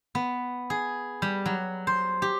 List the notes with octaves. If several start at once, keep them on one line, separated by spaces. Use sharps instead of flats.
B3
G#4
G3
F#3
C5
G4